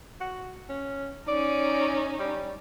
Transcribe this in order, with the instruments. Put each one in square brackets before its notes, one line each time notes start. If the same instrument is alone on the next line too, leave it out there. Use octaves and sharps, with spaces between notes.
[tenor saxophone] F#4
C#4
[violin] C#4 D#4 [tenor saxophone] D5
[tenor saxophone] G3